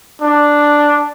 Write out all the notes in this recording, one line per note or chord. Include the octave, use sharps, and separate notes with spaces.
D4